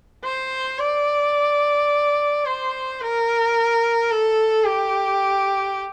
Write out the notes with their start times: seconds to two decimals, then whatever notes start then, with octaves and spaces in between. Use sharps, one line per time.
0.24 C5
0.79 D5
2.46 C5
3.01 A#4
4.11 A4
4.66 G4